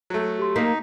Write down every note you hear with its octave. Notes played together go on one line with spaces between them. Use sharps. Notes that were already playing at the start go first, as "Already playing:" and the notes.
F#3 A3
G4 C6
A#3 D#4 B6